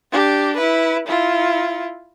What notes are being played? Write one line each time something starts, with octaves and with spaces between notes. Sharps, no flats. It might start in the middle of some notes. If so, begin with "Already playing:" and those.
D4 G4
E4 B4
E4 F4